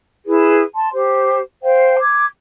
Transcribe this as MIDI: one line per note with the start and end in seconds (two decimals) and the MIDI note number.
0.25 0.61 64
0.25 0.61 68
0.25 0.61 71
0.74 0.89 81
0.74 0.89 84
0.93 1.39 67
0.93 1.39 72
1.62 1.97 72
1.62 1.97 77
1.62 1.97 79
1.98 2.25 86
1.98 2.25 92